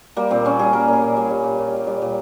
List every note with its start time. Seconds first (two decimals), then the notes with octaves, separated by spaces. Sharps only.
0.17 G3 A#3
0.31 A#2 C4
0.45 A#2 C#4
0.59 G3 G#4
0.73 G3 A#4
0.88 A#2 G#4
1.02 A#2
1.17 G3
1.30 G3
1.44 A#2
1.58 A#2
1.73 G3
1.87 G3
2.02 A#2